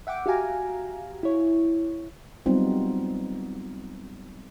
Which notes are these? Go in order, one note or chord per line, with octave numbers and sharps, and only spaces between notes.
E5 F#5 G5 D6
F#4 G4 F5 G#5 A#5
E4 C#5
F#3 G3 B3 C4 D#4 F4